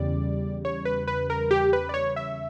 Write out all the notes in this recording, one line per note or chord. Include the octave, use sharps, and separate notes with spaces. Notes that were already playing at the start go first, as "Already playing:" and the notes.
Already playing: E2 C#3 G3 D5
C#5
B4
B4
A#4
G4
B4
D5
C#5
E5